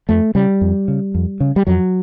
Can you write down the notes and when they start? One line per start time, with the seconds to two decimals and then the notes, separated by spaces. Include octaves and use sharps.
0.09 F2 A3
0.35 C#3 G3
0.61 F2
0.88 C#3
1.15 F2
1.40 C#3
1.56 G3
1.67 F2 F#3